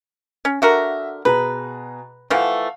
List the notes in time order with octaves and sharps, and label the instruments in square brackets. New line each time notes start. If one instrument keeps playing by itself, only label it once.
[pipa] C#4
[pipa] D3 F#4 A#4 [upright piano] E5
[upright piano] B2 G#4 A#5 [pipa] B4
[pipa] E3 F3 A3 [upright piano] F5 F#5